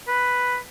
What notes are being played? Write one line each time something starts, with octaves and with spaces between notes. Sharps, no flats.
B4